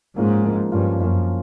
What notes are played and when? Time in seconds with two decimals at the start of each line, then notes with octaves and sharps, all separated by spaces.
0.16 G#2 F3 A#3 C#4 F4
0.44 F3 A#3 C#4 F4
0.72 G2 F3 A#3 C#4 F4
1.00 F#2 F3 A#3 C#4 F4